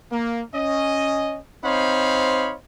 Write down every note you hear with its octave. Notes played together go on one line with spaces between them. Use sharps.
A#3
C#4 D#5
C4 D#4 C5 C#5 F5 B5